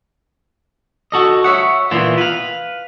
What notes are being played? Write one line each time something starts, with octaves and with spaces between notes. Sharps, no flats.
F#4 A4 D#5
C#5 E5 F#5
A#2 E3 B3 E4 F4
B4 F5